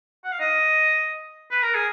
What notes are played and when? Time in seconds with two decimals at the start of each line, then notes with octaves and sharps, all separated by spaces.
0.24 F#5
0.32 F5
0.40 D#5
1.51 B4
1.62 A#4
1.75 G#4